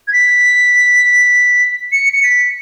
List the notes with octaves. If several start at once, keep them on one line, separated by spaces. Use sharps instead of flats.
G#6
B6
C#7
C#7
B6